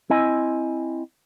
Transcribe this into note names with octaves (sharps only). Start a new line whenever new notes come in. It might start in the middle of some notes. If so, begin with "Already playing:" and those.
C4 E4 D#5 G#5